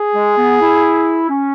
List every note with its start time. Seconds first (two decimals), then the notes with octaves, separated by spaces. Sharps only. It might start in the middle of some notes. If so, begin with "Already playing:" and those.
Already playing: G#4
0.13 G#3
0.37 B3
0.60 E4
1.29 C#4